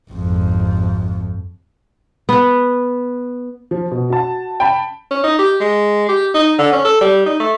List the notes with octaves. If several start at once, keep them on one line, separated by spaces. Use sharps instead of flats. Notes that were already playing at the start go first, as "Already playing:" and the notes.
G#1 F2
B3
F3
B2
F#4 A5
G5 A5 B5
C#4
D#4
G4
G#3
G4
D#4
D3
C#4
A4
G3
D#4
A3